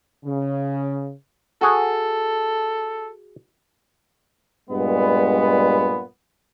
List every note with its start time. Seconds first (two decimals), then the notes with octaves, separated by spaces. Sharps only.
0.24 C#3
1.61 F#4 G#4 A4
4.68 G2 A#2 G#3 B3